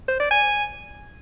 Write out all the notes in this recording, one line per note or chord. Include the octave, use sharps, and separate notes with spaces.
C5
D5
G#5